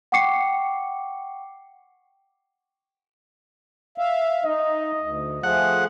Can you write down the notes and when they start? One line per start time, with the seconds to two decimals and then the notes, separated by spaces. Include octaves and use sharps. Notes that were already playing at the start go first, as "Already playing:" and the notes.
0.12 F#5 G5 C#6 D6 C7 C#7
3.98 E5 F5
4.44 D#4 D#5
5.00 D2
5.43 F3 A3 G#4 F#5